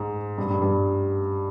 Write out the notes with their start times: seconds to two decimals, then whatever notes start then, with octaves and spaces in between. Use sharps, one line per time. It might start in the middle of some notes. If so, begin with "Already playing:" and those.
Already playing: G#2
0.38 G2
0.50 G2
0.62 G2